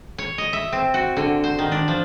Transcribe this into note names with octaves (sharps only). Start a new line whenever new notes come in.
C#5
D#5
E5
C4
F#4
D3
C5
D#3
D4
F3